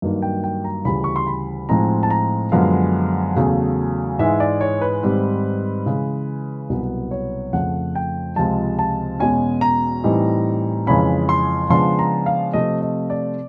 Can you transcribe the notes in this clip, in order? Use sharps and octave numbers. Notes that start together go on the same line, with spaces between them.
G2 D#3 F#3 A#3
G5
G5
A#5
D2 C#3 E3 G3 B5
C#6
C6
B5
A2 F3 G#3 C4 D#4 A#5
A5
A#5
F#2 D3 F3 G#3 B3 F5
E2 C#3 F#3 A3
G#2 E3 G#3 E5
D5
C#5
B4
G#2 D#3 G3 C4
C#3 E3 G#3
C2 B2 F#3 B3
C#5
F2 C#3 F3 A3 F#5
G5
C#2 C3 F3 G#3 A5
A5
E2 B2 G#3 C#4 G#5
A#5
A2 E3 G3 C4 D#4
F2 C#3 E3 G#3 C#4 B5
C6
C#3 F3 G#3 B3 D4 C6
A#5
F5
C3 F3 A3 C4 D#5
D#5
D5